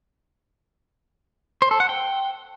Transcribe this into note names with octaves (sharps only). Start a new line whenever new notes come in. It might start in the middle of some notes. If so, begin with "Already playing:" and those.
C5
A4
F#5
G5